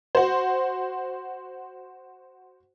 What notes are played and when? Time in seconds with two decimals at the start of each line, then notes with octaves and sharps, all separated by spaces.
0.15 F#4 C5